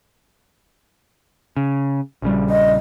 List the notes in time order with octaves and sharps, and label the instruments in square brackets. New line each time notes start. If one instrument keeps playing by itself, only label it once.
[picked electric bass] C#3
A#1 C#3 G3
[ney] D#5